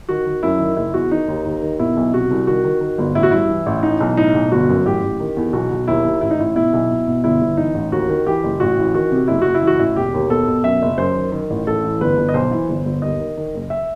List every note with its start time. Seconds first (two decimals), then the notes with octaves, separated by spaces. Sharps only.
0.09 D#3 F#4
0.27 D#3
0.43 F#2 E4
0.59 D#3
0.77 F#1 E4
0.94 E2 F#4
1.11 D#3 D#4
1.28 D#2
1.45 D#2
1.62 D#3
1.79 B2 E4
1.97 B1
2.13 C3 F#4
2.31 C2
2.47 D#3 F#4
2.65 D#3
2.81 D#3
2.98 G1
3.15 A1 E4
3.23 F#4
3.31 G2 E4
3.49 E3
3.66 A1
3.83 E3 D#4
4.00 B1
4.17 A2 D#4
4.34 B1
4.52 G1 F#4
4.69 F#2
4.85 A1 G4
5.03 A1
5.20 D#3
5.37 E2
5.53 B1 F#4
5.71 B1
5.88 D#2 E4
6.05 D#2
6.21 A1 E4
6.31 D#4
6.38 A1 E4
6.55 B2 E4
6.73 B1
6.90 B2
7.07 B2
7.24 G1 E4
7.40 G1
7.57 E3 D#4
7.74 A1
7.92 D#2 F#4
8.09 D#3
8.26 E3 G4
8.44 F#1
8.60 A1 F#4
8.78 E3
8.94 D#3 F#4
9.12 C3
9.28 F#1 E4
9.42 F#1 F#4
9.54 E4
9.62 E3
9.67 F#4
9.79 A1 E4
9.96 E1 G4
10.14 D#2
10.30 B2 A4
10.48 B2
10.64 F#2 E5
10.82 F#1
10.98 F#2 C5
11.15 D#3
11.32 D#3
11.50 A1
11.66 A1 A4
11.84 E3
12.01 G1 B4
12.17 G1
12.29 D#5
12.34 B1 C5
12.51 E3
12.69 G1
12.85 G1
13.02 D#2 D#5
13.20 D#3
13.37 D#3
13.54 F#1
13.70 E5